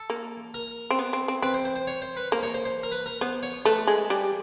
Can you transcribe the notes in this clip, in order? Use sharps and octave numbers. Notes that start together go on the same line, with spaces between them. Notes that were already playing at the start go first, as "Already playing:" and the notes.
Already playing: A4
A#3
A#4
C4
B3
C4
C4
C4 B4
C5
C5
C5
C#5
C5
B4
A#3 C5
C#5
C5
C5
A#4
B4
A#4
B3 C5
C#5
A3 B4
G#3
G3